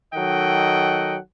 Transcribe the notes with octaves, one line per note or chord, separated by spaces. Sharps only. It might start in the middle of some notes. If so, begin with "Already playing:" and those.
D#3 F#3 A4 D#5 F#5 G5